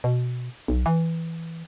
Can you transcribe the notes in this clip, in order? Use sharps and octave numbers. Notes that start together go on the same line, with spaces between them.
B2
B1
E3